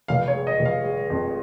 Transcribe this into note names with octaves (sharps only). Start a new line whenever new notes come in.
F1 F5
C#5
G#3
D#5
F1
F5
G#3
F2